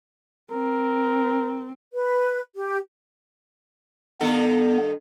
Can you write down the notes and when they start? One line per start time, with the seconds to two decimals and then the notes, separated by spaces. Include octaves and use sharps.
0.52 C4 A#4
1.93 B4
2.55 G4
4.21 G2 D#3 B3 A4